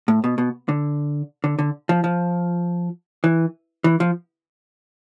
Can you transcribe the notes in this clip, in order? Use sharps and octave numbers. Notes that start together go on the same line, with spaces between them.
A2
B2
B2
D3
D3
D3
F3
F3
E3
E3
F3